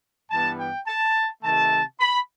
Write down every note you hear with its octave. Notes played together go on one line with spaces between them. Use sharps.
G2 E3 G3 B3 A5
G5
A5
C3 D#3 A3 A5
B5